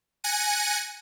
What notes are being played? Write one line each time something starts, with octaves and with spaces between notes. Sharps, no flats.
G#5 F#6 A#6 C#7 D#7